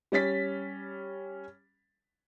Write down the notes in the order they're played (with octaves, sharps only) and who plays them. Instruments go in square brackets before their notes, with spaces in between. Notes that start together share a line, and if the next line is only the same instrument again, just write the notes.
[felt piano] G3 C#4 A6 B6